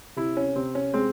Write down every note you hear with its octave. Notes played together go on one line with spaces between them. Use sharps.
C3 E4
C#4
C3 C4
C#4
G#3 C4